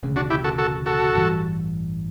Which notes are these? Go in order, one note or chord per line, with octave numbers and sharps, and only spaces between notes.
E1 D2 C#3
D4 F#4
E4 G4
F#4 A4
F#4 A4
F#4 A4
A1 G2 E3 G3